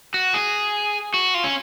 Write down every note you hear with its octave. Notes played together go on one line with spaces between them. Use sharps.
F#4
G#4
F#4
F4
C#4